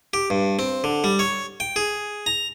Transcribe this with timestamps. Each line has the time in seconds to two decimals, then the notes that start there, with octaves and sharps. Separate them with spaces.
0.14 G4
0.30 G2
0.59 C4
0.84 D3
1.04 G3
1.19 C#5
1.60 G5
1.76 G#4
2.26 A#5